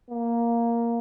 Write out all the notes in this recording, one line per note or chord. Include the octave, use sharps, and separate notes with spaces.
A#3